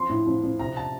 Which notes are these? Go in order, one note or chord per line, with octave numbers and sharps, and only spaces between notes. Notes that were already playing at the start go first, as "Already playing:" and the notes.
Already playing: F3 C6
A2
F3
F3
C3 A#5
A5